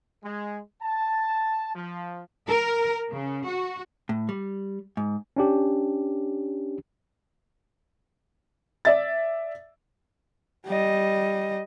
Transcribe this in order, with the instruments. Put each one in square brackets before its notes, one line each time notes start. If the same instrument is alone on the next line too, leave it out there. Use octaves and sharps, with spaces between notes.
[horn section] G#3
A5
F3
[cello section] A#4
C#3
F#4
[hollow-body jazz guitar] A2
G3
G#2
[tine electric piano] C#4 D4 G4
[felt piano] D5 E5 A6
[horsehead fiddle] G3 D#5